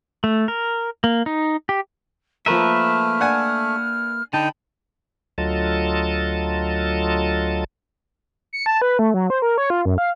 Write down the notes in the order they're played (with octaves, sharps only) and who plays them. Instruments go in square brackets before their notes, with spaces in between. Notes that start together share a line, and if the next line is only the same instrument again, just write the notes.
[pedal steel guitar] A3
A#4
A#3
D#4
G4
[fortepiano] F3 A#4 [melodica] A3 [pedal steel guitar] A#3 B4 E5 [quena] F6
[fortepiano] D4 F#5 G#5
[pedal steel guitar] D3 D#4 [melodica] G5 [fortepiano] A5 [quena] B5
[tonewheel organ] D2 F#3 F4 A4 D#5 A5
[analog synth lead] C#7
A5
B4
A3
F#3
C5
A#4
C#5
F4
F#2
F5